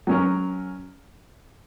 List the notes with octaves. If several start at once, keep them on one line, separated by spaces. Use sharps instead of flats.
F#3 C#4 A#4